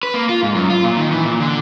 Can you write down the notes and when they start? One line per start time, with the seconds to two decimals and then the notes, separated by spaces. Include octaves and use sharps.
0.03 B4
0.14 A#3
0.29 F4
0.43 G#2
0.55 F#2
0.70 F4
0.84 A#2
0.97 D#3
1.12 E3
1.25 A#2
1.40 D3